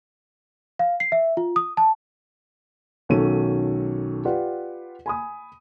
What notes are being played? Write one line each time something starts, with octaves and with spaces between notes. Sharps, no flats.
F5
C7
E5
F4
D#6
A5
B1 D#3 F#3 C#4 A4 D#7
F4 G4 B4 D5 F#5
G#5 B5 D#6